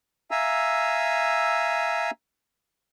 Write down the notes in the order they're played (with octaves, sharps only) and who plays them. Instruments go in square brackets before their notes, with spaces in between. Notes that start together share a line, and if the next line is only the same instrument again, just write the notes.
[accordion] E5 F5 G#5 A#5 E6